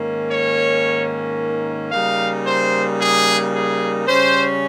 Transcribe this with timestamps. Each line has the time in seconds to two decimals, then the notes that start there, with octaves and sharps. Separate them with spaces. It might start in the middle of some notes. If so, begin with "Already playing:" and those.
Already playing: G#2 D#3 A#3 C#4
0.29 C#5
1.91 C#3 G3 A#3 D#4 F5
2.45 C5
2.99 G#4
3.53 G#4
4.07 C#3 G3 C#4 C5